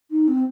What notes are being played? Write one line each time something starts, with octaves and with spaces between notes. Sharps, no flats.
D#4
C4